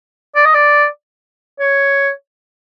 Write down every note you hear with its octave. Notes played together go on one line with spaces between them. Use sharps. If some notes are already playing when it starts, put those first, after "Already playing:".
D5
D#5
D5
C#5